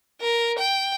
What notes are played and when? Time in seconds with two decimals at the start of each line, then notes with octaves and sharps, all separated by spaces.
0.20 A#4
0.58 G5